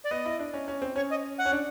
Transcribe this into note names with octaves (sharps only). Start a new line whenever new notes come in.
D5
B3 D#5
E4
D4
C#4
C#4
C4
C#4 C#5
D#5
F#5
C#4
D4